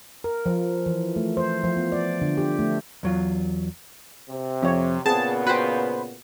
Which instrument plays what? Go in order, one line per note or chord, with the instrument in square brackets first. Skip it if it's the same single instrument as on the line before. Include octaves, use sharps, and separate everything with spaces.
[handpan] A#4
F3
E3
A3
C5
F3
B3
D5
D3
G4
A3
[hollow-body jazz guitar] E2 F#3 F4
[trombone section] C3
[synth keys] F2 [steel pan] C4 C#5
[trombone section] A#2 C#3 B3 [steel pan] C4 G#4 [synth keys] A5
[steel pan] F#4 G5 [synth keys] B4 C5